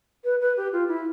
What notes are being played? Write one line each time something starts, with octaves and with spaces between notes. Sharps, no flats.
B4
B4
G4
F4
E4